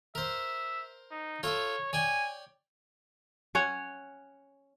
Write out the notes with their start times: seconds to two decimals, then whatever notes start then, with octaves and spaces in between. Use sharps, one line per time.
0.15 A#4 C5 E5
1.11 D#4
1.43 F4 A4 C#5 E5
1.93 C#5 D5 G5 G#5
3.55 C#4 C#5 F#5